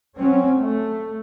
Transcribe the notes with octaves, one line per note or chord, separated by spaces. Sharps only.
F#3 C4 C#4
A3